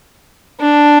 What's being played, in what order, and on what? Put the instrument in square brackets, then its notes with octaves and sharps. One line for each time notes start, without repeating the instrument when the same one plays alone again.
[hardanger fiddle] D4